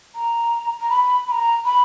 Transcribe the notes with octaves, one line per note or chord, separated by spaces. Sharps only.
A#5
A#5
B5
B5
A#5
B5